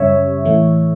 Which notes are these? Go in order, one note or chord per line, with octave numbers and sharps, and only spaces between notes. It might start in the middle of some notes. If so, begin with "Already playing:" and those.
Already playing: F#2 C#3 G3 C#5 E5
A2 E3 A3